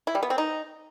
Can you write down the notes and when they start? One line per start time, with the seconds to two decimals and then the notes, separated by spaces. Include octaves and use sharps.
0.07 E4
0.15 G3
0.23 B3
0.30 C4
0.38 D#4